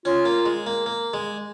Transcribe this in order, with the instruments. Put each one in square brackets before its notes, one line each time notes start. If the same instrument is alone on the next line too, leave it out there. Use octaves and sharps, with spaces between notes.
[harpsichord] C#4 [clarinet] F4
[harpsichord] A#3
G#3
A#3
A#3
G#3